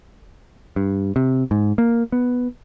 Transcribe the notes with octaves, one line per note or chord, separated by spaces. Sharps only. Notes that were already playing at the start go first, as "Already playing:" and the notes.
G2
C3
G#2
A#3
B3